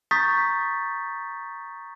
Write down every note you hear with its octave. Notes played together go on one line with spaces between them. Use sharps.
A#5 C#6 D#6 G6 A6 B6